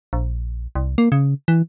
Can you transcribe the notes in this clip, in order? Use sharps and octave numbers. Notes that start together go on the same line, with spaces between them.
A#1
C2
A#3
C#3
E3